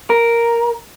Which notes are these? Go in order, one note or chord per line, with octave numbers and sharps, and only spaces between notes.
A#4